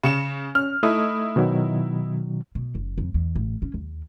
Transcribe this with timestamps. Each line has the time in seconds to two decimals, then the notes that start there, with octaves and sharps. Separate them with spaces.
0.03 C#3 C#7 E7
0.55 C#4 F6
0.83 A3 D#4 E4 D#6
1.36 B2 D#3 F#3
2.55 B2
2.75 F#1
2.98 F2
3.14 E2
3.35 A1
3.62 C#4
3.74 D#2